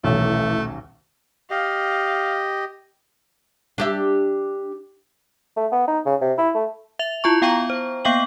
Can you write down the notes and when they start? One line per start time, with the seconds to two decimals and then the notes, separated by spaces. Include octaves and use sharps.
0.04 D#1 B1 E3 A3
1.51 G4 D#5 F5
3.78 D4 G4 E5
5.57 A3
5.72 B3
5.88 D#4
6.06 C#3
6.21 C3
6.38 E4
6.55 A3
6.99 E5 F7
7.24 E4 F4 A5 C#6
7.42 B3 F5 G5 A#5 C#6
7.70 C5
8.05 A#3 B3 F5 G5 F#7